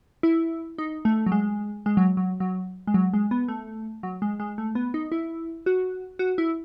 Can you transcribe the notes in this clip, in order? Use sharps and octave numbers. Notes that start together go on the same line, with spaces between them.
E4
D#4
A3
F#3
G#3
G#3
F#3
F#3
F#3
G#3
F#3
G#3
B3
A3
F#3
G#3
G#3
A3
B3
D#4
E4
F#4
F#4
E4